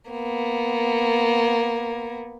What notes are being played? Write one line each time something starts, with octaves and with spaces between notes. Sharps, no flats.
A#3 B3